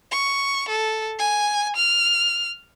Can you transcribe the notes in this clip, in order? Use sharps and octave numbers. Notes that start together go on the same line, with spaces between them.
C#6
A4
G#5
F6